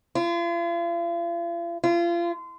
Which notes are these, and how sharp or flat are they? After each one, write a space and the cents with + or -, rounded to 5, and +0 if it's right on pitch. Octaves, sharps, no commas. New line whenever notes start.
F4 -40
F4 -30